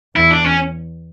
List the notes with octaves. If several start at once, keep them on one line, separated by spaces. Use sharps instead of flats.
E2 E4
D4
C#4